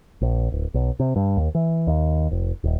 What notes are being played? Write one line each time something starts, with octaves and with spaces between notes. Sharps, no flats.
A#1
D1
B1
C3
G2
D#2
E3
D#2
F1
D#1